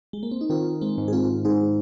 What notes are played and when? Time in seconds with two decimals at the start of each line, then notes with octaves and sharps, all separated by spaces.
0.13 G#3
0.23 A#3
0.31 C4
0.41 D#4
0.50 D#3 C4 F4
0.81 G#3 C4
0.98 G#2
1.08 G#4
1.13 C4 F4
1.45 G#2 D#4 G#4